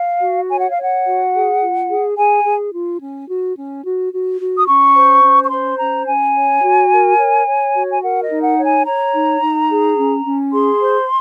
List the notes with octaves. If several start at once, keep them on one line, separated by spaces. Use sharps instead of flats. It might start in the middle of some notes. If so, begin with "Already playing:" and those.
Already playing: F5
F#4
C#5 G#5
F#5
F5
C#5
F#5
F#4
G#4
F4
G#4
G#4 G#5
G#4
F4
C#4
F#4
C#4
F#4
F#4
F#4
D#6
C#4 C#6
C5
C#4
C#6
C5 C6
C#4 A#5
C#4 G#5
C#5
F#4
A#4
C#5
C#5
F#4
G#5
A#4 F#5
D#5
D#4
F#5
C#5
G#5
C#5 A#5
D#4
D#4
G#4
C#4
C#4
G#4 C6
C5